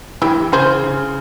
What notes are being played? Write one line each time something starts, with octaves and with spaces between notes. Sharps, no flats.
E3 E4 G4
C#3 G#4 C5
C#3